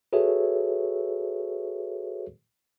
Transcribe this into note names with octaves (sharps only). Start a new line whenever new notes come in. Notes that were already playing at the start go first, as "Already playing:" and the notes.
F#4 G#4 A4 B4 C#5 E5